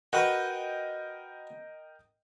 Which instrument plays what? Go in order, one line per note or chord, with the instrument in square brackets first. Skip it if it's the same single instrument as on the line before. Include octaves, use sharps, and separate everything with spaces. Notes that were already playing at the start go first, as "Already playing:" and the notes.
[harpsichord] F#4 B4 [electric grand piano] A#4 D#5 G5